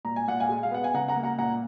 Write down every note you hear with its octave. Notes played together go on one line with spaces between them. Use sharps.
A#2 A#5
G#5
A#2 F#5
F5 G#5
G#3
F5
B3 F#5
G#5
C#3 F#5 A#5
F#5 A#5
A#3
F#5 A#5
A#2 F#5 A#5